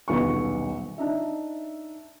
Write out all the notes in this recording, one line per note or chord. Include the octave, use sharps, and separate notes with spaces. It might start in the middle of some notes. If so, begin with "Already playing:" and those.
D#1 B1 B3 D4 C#6
D4 D#4 E5